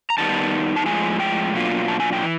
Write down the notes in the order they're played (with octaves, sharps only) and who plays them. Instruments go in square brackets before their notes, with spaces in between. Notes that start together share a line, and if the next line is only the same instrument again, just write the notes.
[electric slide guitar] A#5
D#3 G3 B3 D#4 A5
A5
A2 F3 G#3 G#5
G5
B2 F#3 A#3 D4 F4
A5
G#5
G5
E3